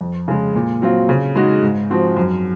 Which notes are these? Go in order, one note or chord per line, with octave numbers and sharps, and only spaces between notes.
F2
C#3 G#3
A#2
F#3 C4 F4
C#3
G#3 D#4 F#4
G#2
F3 C4 F#4
F#2